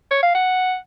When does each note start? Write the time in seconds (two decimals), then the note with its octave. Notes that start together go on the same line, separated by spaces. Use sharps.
0.11 C#5
0.23 F5
0.35 F#5